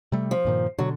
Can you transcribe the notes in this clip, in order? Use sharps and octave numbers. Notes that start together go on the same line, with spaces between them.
C3 G3 A3
F3
G2 A#2 D#3
B2 D3 F#3